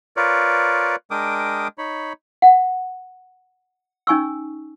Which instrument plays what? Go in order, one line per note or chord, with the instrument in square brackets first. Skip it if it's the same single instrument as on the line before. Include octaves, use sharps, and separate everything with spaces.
[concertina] F4 A#4 B4 C#5 D5
G#3 D4 A#4 G5 D6 D#6
D#4 C#5 B5
[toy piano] F#5
C#4 D#4 G#5 C#6 E6